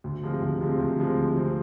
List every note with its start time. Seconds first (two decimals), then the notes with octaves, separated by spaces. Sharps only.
0.04 D2
0.23 C3 F3 G#3 C4
0.42 D2
0.61 C3 F3 G#3 C4
0.79 D2
0.99 C3 F3 G#3 C4
1.17 D2
1.37 C3 F3 G#3 C4